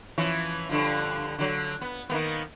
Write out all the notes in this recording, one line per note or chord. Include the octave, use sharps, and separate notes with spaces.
E3 F3 C#4
G2 D3 F3
D3 F#3
B3
D#3 A#3 B3